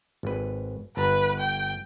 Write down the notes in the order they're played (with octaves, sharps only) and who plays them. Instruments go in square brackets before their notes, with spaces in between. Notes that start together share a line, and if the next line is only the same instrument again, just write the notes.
[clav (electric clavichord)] G#1 B4
[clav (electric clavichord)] G1 A5 A#5 [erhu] B4
[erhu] G5